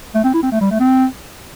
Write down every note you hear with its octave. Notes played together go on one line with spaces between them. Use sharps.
A3
C4
E4
C4
A3
G3
A3
C4